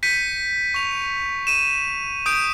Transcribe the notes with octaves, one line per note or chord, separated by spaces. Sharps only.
G6 B6 C#7 D#7
C#6 F7
D#7 E7
D#6 G6 D7